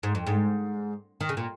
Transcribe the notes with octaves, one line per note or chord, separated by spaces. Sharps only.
G#2
F2
G#2
D#3
C#3
A#2